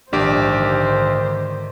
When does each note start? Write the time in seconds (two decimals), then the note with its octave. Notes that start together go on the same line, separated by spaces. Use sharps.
0.13 A#1 G#2 D3 D#3 D4 G4 C5 D7